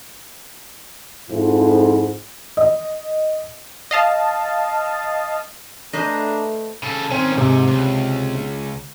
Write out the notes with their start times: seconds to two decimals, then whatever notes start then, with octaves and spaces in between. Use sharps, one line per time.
1.30 F2 G#2 F3 E4
2.57 D#5
3.91 D#5 F5 A5
5.93 A3 D4 B4 C5 D#5 A#5
6.83 C#3 A4
7.11 D#3 C4 C#4
7.38 G#2 C3
7.68 C#2